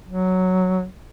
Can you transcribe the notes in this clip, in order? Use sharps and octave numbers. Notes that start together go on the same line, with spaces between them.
F#3